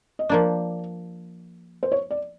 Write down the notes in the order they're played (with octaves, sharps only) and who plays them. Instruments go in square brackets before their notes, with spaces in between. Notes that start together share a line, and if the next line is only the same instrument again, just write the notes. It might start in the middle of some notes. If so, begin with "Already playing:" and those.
[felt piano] D#5
[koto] F3 A#3 D4 [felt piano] D5
[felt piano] C5
C#5
D5